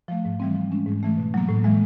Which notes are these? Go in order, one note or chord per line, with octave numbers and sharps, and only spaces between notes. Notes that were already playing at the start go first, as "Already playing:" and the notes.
F3 A3
G#2
E3 G3 C4
F3
G#3 C#4
G#2
E3 A3
B2
F#3 A#3
A2
E3 G#3